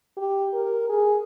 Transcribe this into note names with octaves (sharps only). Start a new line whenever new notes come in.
G4
A#4
G#4